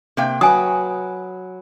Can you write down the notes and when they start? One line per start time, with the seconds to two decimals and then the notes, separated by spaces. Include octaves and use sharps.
0.17 C3 A#3 G5
0.41 F#3 B4 G#5 D#6